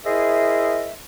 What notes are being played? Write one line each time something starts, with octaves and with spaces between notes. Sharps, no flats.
E4 G#4 A#4 C5 D#5 E5